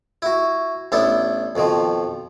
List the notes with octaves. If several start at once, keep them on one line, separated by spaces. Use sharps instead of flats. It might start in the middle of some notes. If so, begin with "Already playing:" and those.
E4 F#4
A1 B3 D4 E4 A4
F2 B2 D#3 F3